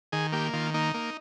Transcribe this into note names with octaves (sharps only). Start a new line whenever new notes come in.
D#3 G#4
A#3 G4
D#3 F4
A#3 D#4
A#3